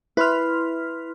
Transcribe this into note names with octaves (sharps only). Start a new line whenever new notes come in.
E4 B4 C6 F6